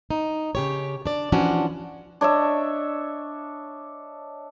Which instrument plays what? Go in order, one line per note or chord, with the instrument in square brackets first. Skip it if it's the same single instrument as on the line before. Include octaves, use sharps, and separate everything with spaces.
[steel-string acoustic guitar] D#4
C#3 G4 C#5
D4 D5
E3 F3 C#4 D4 F#4
[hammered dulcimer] D4 C#5 D#5 E5